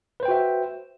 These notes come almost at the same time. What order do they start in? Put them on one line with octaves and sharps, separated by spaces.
B4 C5 G5 F#4 E5